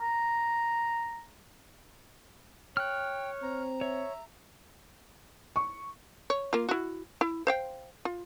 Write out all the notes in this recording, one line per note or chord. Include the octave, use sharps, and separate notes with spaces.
A#5
C#5 G5 F6 F#6
C4 A#5
C#5 E5
C#6
C#5
A#3 F4
E4 F#4
E4
C5 F5 G5
F4